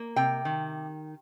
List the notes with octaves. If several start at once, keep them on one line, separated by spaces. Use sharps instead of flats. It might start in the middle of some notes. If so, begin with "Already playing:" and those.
Already playing: A#3
C3 G5
D#3